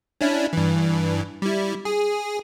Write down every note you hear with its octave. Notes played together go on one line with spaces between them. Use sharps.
C#4 D4 E4
G2 E3
G3 E4
G#4